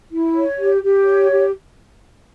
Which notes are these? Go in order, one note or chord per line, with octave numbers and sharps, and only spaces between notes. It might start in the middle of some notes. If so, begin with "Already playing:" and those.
E4
C#5
G4
G4
C#5
G4